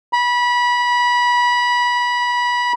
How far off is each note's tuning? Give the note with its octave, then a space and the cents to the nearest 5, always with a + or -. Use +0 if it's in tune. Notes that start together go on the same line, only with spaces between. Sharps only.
B5 -25